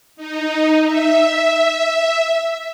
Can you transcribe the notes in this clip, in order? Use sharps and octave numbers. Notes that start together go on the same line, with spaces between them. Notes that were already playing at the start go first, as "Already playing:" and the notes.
D#4
E5